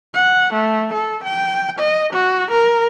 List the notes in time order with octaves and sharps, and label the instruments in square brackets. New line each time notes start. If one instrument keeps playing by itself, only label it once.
[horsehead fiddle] F#5
A3
A4
G5
D#5
F#4
A#4